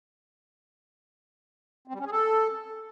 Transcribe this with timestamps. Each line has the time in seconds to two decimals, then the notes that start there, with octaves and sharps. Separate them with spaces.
1.88 C4
1.94 G3
2.00 C#4
2.06 G#4
2.12 A4